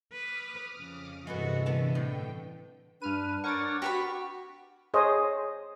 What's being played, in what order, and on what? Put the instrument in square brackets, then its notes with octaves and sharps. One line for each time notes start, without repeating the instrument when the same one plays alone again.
[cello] B4 [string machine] D6 D#6 F6
[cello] F2 C#3
[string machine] G2 C3 E3 [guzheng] G#3 B3 B4 [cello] F#4 A4
[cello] D3 [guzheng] B3 A5
[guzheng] A2 [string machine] G5
[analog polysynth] G2 F6 D#7 [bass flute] D4 [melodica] B4
[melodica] A#4 C#5 F#5 [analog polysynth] C#6 D6 A6
[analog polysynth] F#4 [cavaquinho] G4 B4 B5 [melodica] C#6
[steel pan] G#4 C5 C#5 D#5